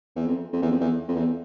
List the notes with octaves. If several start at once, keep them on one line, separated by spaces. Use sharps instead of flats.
E2
F2
F2
E2
F2
E2
F2
E2